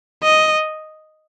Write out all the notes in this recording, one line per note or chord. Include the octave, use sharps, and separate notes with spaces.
D#5